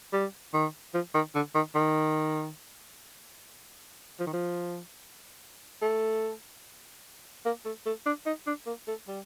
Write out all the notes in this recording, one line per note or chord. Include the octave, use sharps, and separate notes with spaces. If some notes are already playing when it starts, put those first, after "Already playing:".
G3
D#3
F3
D#3
D3
D#3
D#3
F3
D#3
F3
A3
A#3
A3
A3
D4
D#4
D4
A#3
A3
G3